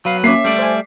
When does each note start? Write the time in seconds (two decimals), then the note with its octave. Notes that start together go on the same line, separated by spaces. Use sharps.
0.05 F#3 B4 F5
0.24 A#3 C#4 E5 D6 B6 C7
0.44 G3 A3 D5
0.59 C5 G#5